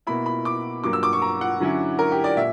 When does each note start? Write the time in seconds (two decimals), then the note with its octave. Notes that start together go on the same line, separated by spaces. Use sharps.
0.07 B2 A#3 E4 B5
0.26 B5
0.45 D6
0.84 G2 F#3 A#3 D6
0.93 E6
1.03 D6
1.13 C#6
1.22 A#5
1.41 F#5
1.60 D3 F#3 C#4 E4
1.99 A#4
2.11 G4
2.24 D5
2.37 A#2 E5